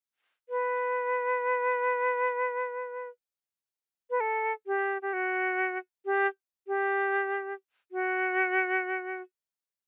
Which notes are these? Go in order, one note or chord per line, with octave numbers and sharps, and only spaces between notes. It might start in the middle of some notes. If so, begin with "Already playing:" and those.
B4
B4
A4
G4
G4
F#4
G4
G4
F#4